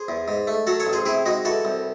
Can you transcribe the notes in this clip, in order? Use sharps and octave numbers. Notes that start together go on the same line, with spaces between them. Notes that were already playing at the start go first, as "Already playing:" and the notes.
Already playing: G#4 C5
E2
G#2
A3
F#3 F#4 A4
A4 C#5
A1
G#4 C5
C3 E4 G#4
G#3 D#4 F#4
E3 F#4 A4
C2